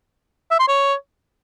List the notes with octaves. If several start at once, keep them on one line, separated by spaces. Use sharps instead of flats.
E5
C6
C#5